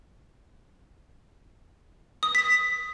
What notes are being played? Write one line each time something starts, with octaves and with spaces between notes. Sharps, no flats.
D#6
B6